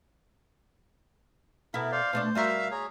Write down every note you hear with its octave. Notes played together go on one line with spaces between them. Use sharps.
B2 B3 E4 A4 A#4 E5
C5 D5 F5
B2 A3 D4 C5
G3 F#4 A#4 E5 F5
G#4 C#5 A#5